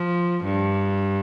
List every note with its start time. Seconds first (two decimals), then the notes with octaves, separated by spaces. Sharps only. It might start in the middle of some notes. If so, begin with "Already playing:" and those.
Already playing: F3
0.44 G2